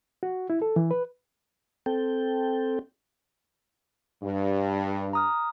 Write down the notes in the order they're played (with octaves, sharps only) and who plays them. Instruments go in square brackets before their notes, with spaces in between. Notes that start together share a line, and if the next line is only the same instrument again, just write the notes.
[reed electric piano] F#4
E4
A4
E3
B4
[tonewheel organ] C4 A4 G5
[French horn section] G2
[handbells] A#5 D#6 F6